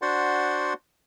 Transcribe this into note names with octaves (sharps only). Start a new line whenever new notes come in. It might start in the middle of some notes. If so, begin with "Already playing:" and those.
D4 F#4 C5 D5 F#5 C6